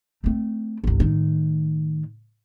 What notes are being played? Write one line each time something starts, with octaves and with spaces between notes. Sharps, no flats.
A3 C4
G1 C2
A2 D#3